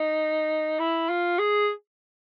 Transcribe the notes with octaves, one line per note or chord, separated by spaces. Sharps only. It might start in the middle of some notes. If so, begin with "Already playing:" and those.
Already playing: D#4
E4
F4
G#4